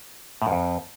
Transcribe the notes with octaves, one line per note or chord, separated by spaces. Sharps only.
A2
F#2
F2